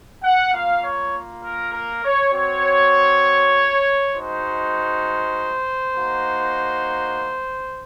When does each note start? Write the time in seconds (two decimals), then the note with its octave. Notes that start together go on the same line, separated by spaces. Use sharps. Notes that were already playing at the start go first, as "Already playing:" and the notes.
0.23 F#5
0.53 A#3 F4 F5
0.82 C#5
1.42 A#4
1.73 A#4
2.03 C#5
2.32 C4 F#4 C#5
4.13 G#3 D#4 F#4 C5
5.95 A#3 D#4 F#4